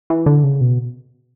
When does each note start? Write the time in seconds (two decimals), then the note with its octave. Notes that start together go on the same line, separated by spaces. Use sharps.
0.10 E3
0.26 D3
0.44 C#3
0.61 B2